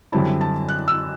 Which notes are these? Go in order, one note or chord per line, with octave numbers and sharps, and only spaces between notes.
F#2 D3 G3 C4 E4 A5
A5
F#6
E6